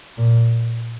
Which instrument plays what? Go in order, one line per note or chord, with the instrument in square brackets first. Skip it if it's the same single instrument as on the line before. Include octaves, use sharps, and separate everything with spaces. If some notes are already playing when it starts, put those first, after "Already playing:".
[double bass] A#2